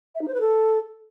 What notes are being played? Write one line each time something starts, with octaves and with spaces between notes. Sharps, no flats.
E5
D#4
C5
B4
A4